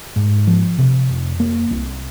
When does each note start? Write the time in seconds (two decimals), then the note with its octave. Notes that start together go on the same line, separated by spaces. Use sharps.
0.16 G#2
0.47 F3
0.78 C3
1.09 F1
1.40 A#3
1.71 C2